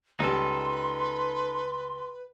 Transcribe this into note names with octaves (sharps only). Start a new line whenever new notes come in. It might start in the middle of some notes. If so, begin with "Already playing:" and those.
C#2 G3 D#4 A4 B4 C6